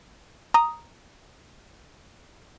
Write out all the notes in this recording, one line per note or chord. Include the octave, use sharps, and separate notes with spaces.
A#5 D#6